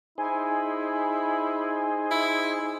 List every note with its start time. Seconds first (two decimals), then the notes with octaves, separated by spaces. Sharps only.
0.18 D#4 E4 G#4 C5 G#5
2.11 E4